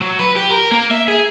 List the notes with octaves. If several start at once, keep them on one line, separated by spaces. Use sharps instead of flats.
F#3
B4
G4
A#4
A#3
E5
G#4